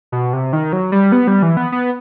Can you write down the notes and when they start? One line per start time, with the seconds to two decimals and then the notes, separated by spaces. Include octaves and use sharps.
0.12 B2
0.33 C3
0.53 D#3
0.73 F#3
0.92 G3
1.12 B3
1.27 G3
1.42 E3
1.57 B3
1.72 B3